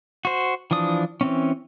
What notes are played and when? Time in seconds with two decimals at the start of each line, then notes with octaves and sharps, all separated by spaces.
0.25 F#4 C5
0.71 E3 F3 D4 D#6
1.21 E3 C4 C#4